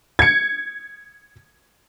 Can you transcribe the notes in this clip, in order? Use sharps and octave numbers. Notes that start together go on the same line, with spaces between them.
G#6 C#7